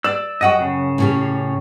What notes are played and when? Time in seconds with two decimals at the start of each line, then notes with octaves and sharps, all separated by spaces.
0.04 D5 E6
0.41 F#2 F#4 D#5 F#5 G5
0.61 C#3
0.98 A2 C#4 G4